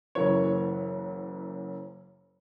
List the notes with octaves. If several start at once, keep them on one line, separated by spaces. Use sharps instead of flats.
F#1 F#2 E3 A#3 C#5